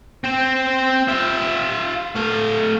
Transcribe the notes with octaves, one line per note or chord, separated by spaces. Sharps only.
C4 C5
F4 E5
A3 F5